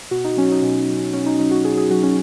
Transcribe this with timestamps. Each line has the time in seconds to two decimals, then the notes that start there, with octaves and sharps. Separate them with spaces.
0.11 B2 F#4
0.24 D#4
0.37 F#3 C#4
0.52 D#4
0.62 B2
0.88 F#3
1.13 B2 C#4
1.26 D#4
1.39 F#3 D#4
1.51 F#4
1.64 B2 G#4
1.77 G#4
1.90 F#3 F#4
2.03 C#4